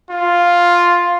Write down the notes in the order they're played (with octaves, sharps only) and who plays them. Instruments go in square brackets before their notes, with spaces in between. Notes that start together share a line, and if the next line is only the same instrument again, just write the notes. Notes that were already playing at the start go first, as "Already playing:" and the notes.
[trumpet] F4